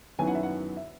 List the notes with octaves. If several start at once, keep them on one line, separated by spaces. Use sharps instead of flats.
F#2 D#3 F#3 B3 E4 G#5
F#5
E5
F#5
E5